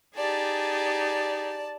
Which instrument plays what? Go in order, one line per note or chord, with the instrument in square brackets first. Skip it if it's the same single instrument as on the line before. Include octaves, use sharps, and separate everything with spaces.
[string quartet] D#4 G4 G#4 [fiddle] D5 A5